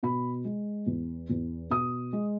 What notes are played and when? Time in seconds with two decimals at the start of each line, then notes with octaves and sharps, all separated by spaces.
0.03 B2 B5
0.45 G#3
0.87 E2
1.29 E2
1.70 B2 D#6
2.13 G#3